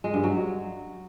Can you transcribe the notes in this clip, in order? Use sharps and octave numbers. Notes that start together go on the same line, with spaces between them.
G#3
G2
F#3